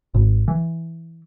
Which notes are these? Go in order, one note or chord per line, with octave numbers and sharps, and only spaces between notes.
G#1
E3